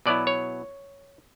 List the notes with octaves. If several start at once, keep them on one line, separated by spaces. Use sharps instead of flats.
B2 F#3 B3 E4 D5
C#5